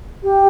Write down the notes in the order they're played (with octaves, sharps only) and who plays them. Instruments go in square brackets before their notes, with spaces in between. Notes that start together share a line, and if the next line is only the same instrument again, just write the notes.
[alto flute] G4